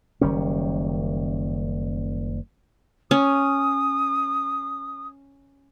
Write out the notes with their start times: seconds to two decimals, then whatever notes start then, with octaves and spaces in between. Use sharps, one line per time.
0.21 F#1 D#3 G3 C#4
3.11 C#4 D#6